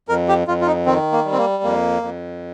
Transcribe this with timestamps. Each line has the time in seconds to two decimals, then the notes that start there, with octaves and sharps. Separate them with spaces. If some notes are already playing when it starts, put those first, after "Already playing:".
0.09 F2 A#4
0.28 G4
0.48 F2 F4
0.61 F4
0.67 D#4
0.86 D#3 C4
1.12 A#3
1.25 G3
1.32 C4
1.38 A#3
1.63 F2 A#3
2.02 F2